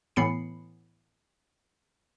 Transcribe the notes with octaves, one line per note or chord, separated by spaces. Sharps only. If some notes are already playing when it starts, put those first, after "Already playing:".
A2 E3 B3 B5 C7 C#7